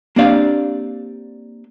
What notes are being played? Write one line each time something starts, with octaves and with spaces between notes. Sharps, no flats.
A#3 C4 D4 G4 D5 F5